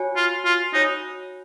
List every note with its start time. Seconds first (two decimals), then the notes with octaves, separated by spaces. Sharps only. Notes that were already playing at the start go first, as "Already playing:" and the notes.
Already playing: F#4 C#5 G#5
0.16 F4
0.45 F4
0.74 D#4 F#4 C#5 G#5